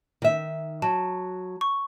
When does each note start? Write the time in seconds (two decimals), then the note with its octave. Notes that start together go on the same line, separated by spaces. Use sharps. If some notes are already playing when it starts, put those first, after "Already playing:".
0.22 D#3 E5
0.82 F#3 A5
1.61 C#6